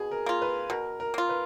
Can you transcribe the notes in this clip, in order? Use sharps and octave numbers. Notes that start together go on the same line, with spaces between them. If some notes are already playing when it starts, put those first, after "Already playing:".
Already playing: B2 G#4
A#4
A#3 F4
B4
B2 A#4
A#4
A#3 F4
B4